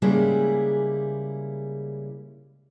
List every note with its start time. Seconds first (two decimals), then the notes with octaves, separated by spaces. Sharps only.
0.02 C#3 G3 G#3 A#3 E4 G#4